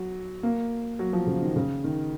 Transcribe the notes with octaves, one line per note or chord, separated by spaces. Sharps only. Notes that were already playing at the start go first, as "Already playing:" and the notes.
Already playing: F#3
A#3
F#3
F3
C#3
D#3
C#3
D#3